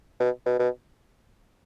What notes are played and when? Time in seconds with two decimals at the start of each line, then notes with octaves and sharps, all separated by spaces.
0.20 B2
0.46 B2
0.59 B2